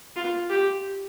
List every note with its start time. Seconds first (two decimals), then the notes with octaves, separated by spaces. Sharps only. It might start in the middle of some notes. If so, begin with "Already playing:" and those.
0.16 F4
0.50 G4